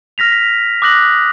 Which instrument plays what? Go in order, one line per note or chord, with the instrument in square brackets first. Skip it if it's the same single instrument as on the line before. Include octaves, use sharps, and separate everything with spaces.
[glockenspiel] F6 A#6 B6 F7
B6
D6 D#6 F#6 A#6 F#7